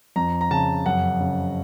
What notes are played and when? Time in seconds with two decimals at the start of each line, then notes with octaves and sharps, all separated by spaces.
0.16 F2 A#5
0.41 A#5
0.51 C#3 A5
0.85 F#2 F#5
1.20 C#3